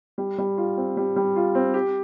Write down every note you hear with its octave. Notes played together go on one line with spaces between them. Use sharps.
G3
G3
F4
C4
G3
G3
F4
C4
G4